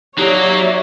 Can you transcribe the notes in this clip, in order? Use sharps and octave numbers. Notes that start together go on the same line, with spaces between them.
F#3 A#3 D#4 G4 C#5 D5 E5 D#6